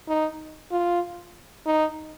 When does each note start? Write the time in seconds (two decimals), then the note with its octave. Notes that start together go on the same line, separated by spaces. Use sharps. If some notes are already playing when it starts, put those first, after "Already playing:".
0.08 D#4
0.72 F4
1.66 D#4